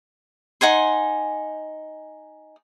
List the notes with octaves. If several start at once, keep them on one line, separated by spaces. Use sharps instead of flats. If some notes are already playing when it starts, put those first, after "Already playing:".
D#4 F#5 G#5 C6